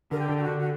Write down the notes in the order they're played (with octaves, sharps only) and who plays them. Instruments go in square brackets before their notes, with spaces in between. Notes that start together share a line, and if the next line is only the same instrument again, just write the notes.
[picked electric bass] D3 [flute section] A#4
[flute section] G4
[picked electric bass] D3
[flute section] G4
F#4
[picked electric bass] D3
[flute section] F#4